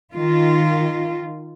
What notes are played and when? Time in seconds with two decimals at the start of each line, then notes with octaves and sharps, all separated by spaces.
0.13 D#3 F4